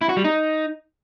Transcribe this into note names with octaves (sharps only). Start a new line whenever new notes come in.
E4
F#4
G3
D#4